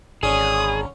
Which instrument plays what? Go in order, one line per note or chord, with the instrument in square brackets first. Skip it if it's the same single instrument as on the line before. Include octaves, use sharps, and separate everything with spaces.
[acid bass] G#1 [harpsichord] D3 C#4 [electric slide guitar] G#4 [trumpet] D#6